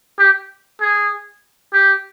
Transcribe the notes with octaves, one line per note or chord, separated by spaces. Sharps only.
G4
G#4
G4